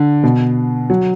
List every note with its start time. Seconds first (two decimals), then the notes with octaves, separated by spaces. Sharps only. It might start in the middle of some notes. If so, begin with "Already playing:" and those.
Already playing: D3
0.24 B2
0.90 F#3